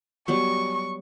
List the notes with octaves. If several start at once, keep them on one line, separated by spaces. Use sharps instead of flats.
F#3 G3 B3 C#6